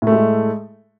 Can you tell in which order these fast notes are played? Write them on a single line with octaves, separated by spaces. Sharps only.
A2 A3 G#3